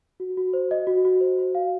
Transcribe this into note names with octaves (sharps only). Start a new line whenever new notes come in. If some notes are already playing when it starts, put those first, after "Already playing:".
F#4
F#4
C5
D#5
F#4
F#4
C5
C5
F5